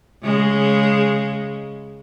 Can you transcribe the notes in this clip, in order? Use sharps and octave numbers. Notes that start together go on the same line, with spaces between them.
C#3 G#3